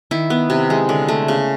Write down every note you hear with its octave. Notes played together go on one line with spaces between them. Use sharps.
D#3 E4
B3
C3
G#3
D3
A3
C#3